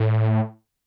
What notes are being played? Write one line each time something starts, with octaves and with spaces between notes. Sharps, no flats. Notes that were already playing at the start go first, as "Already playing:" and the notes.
Already playing: A2